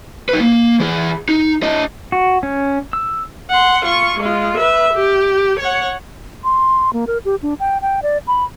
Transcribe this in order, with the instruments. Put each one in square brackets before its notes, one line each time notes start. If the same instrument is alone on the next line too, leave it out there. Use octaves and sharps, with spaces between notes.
[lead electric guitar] D#4 B4
A#3
E3 G#4
D#4
D4 D#5
[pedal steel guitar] F#4
C#4
E6
[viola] F#5 C6
F4 C#6
G#3 F4
B4 E5
G4
C#5 F#5
[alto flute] C6
A#3
A#4
G4
D4
G5
G5
D5
B5